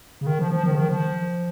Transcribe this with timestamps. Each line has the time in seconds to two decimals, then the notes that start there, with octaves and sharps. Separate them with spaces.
0.21 C#3
0.27 D#3
0.39 F3
0.52 F3
0.64 D#3
0.71 C#3
0.76 D#3
0.89 F3